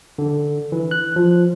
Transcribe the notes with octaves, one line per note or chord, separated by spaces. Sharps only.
D3
E3
F#6
F3